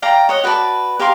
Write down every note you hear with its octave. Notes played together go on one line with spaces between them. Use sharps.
D5 F5 G5 A#5
C#5 D#5 F#5
F#4 B4 D5 A5
G4 A#4 F5 C6